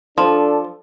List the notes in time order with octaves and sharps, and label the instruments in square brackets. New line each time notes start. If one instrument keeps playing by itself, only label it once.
[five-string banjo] F3 [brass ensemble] D4 A4